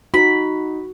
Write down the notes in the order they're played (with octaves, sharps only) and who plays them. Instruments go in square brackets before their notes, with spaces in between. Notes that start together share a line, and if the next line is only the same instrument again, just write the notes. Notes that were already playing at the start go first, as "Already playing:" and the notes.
[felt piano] D#4 [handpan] F#4 [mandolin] B5